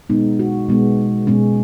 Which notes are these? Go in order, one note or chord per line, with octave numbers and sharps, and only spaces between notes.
B2 G#3 B3 D#4
F#4
B2 G#3 B3
B2 G#3 B3 C#4